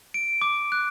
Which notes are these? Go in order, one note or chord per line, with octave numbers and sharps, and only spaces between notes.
D7
D6
F#6